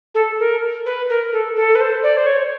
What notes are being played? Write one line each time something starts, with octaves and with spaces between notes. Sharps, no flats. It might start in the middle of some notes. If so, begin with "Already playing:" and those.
A4
A#4
B4
A#4
A4
A4
B4
C5
D5
C5
C#5